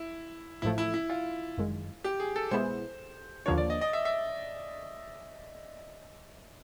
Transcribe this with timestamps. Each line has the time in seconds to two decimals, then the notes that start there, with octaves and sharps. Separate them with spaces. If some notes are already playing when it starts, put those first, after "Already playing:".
Already playing: E4
0.62 A1 A2 F3 A3 E4
0.78 E4
0.94 E4
1.10 F4
1.57 G1 F#2 D#3 G#3
2.04 G4
2.20 G#4
2.36 A4
2.51 B2 G#3 B3 E4 G#4 C5
3.46 D#2 D3 F3 A#3 D4 C#5
3.58 D5
3.70 D#5
3.81 D#5
3.93 E5
4.05 E5